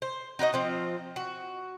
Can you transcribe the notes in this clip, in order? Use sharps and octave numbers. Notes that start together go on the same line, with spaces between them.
C5
D#4 F#4 B4 D#5
F3 C4 F4
F#4